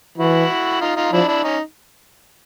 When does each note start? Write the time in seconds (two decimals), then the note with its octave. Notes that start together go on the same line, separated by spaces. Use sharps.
0.18 E3 E4 F#4
0.81 D#4 F4
0.96 D#4 F4
1.12 F3 D4 E4
1.28 D4 E4
1.44 C#4 D#4